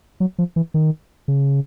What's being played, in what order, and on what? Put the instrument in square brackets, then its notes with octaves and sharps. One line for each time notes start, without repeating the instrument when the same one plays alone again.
[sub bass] F#3
F3
E3
D#3
C#3